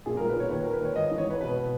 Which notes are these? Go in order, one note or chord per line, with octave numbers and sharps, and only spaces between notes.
A#2 G#4
A#4
B1
B4
A#2 C#5
D#2 B4
A#4
D#3
B4
D#2 C#5
G#1 D#5
D#5
E3
C#5
G#1 B4
B2 B4
B2